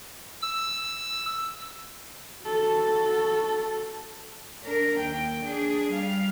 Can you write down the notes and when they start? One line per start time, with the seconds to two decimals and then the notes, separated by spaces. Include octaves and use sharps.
0.42 E6
2.45 F#4 A4
4.64 D4 A#4
4.99 D#2 G5
5.45 D4 G#4
5.90 G3 F5